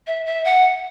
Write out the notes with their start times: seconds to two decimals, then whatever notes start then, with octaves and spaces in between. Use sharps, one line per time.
0.07 E5
0.26 E5
0.45 F#5